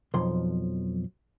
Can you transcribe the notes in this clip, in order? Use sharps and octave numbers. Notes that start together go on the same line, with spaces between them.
B1 F2 F3 C6